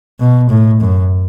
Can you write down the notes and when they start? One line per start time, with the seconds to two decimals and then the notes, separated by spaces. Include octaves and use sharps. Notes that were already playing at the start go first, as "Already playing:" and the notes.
0.20 B2
0.50 A2
0.81 F#2